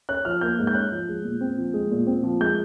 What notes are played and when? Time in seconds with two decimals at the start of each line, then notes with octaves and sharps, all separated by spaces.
0.09 C#4 F#6
0.25 F3 F6
0.41 A#3 G6
0.59 G#2
0.67 G6
0.75 C#4 F#6
0.92 F3
1.09 G#3
1.24 A#2
1.41 C4
1.58 F3
1.74 G#3
1.91 A#2
2.07 C4
2.23 F3
2.40 G#3 G6